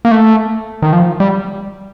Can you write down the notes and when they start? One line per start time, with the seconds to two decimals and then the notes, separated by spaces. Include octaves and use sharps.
0.05 A#3
0.11 A3
0.82 D#3
0.93 F3
1.20 G3